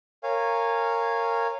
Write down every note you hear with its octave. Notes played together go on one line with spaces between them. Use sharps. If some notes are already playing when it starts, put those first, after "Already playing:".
A#4 C#5 F5 G#5